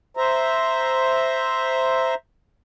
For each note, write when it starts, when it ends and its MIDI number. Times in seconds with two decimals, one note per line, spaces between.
0.17 2.15 72
0.17 2.15 76
0.17 2.15 82